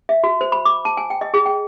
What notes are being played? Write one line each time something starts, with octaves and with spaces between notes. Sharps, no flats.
E5
F#4
C5
B5
D6
A5
G#5
G5
D#5
G#4
G5